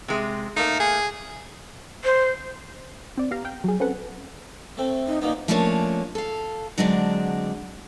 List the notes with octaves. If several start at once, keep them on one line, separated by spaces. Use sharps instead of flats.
C3 G#3
A3 A#3 D#4
G#4
C5
C4 D5
B3 G4 F5 A#5
F5 G5
F#3 G#4
C4 C#4 F#4 A4 B4 F#5
A3 C4
D#4
A#2 A#3 B3 D#4
F3 A3 A#3 C#4 D4 C#5
A4 F5
D3 F#3 G#3 C4 D4 D5